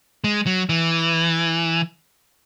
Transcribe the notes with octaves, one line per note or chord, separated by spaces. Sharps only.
G#3
F#3
E3